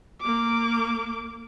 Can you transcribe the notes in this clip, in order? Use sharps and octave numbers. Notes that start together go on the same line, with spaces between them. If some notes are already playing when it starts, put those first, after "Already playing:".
A#3 D6